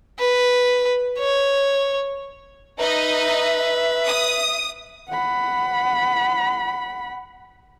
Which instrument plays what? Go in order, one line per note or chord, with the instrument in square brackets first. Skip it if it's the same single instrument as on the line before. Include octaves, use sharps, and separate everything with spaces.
[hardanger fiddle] B4
C#5
[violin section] D#4 D#5 [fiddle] B4 [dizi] E5
[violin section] D#6
[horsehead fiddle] F#5 B5